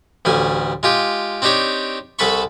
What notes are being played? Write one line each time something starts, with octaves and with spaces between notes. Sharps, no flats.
A1 D2 G3 G#5
G#3 F4 G4
C4 D4 D#4 G4 C#5
C2 A4 B4 A5 B5 C#6